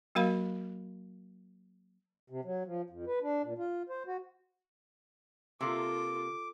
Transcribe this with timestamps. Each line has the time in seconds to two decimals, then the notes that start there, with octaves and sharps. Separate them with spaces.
0.15 F#3 A#3 F#4 A#4 F5 B5
2.30 C3
2.45 F#3
2.66 F3
2.90 F2
3.07 B4
3.22 D4
3.44 A#2
3.58 F4
3.89 C5
4.07 F#4
5.61 C3 A#3 F4 A4 D6